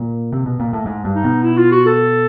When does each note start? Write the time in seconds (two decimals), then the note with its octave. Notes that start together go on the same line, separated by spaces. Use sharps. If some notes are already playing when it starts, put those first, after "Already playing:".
Already playing: A#2
0.32 C3
0.46 B2
0.60 A#2
0.73 A2
0.86 G#2
1.05 G2
1.14 D#4
1.24 B2
1.43 E4
1.57 F4
1.72 F#4
1.86 A4